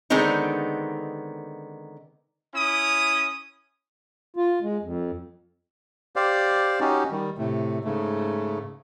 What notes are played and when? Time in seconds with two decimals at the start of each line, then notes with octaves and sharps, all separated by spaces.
0.10 D3 D#3 G#3 B3 C4 D#4
2.55 C#4 E4 D#6
4.36 F4
4.62 G#3
4.82 F2
6.16 G4 C5 D5 F5
6.80 C#4 D#4 F#4 G4
7.11 D#3 G3
7.38 A2 C3 A3
7.84 G#2 C#3 A3